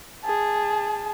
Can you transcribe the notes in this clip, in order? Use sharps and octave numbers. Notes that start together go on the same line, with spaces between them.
G#4 A5